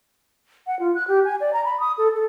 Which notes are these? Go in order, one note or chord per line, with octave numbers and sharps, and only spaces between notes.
F#5
F4
F#6
G4
G#5
D5
A#5
B5
D#6
A4
A4